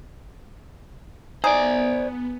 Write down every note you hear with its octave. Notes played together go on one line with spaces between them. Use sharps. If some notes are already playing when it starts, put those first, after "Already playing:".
B3 D#4 G#4 C5 D5